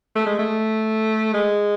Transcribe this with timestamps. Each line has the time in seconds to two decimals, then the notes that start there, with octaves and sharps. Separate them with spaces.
0.15 A3
0.26 G#3
0.38 A3
1.33 G#3